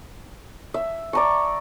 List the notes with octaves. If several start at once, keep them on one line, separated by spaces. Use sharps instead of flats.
E5
D5 A#5 C#6